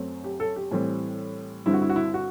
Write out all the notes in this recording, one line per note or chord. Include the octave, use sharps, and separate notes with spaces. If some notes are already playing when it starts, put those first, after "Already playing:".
Already playing: F#2 F#3 A3 C4
G4
A4
G4
A2 E3 G3 C4
G2 D3 G3 C4 E4
F#4
E4
F#4
E4
F#4